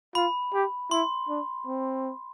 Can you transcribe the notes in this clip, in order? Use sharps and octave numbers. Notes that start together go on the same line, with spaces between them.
F4 B5
G4
E4 C6
D4
C4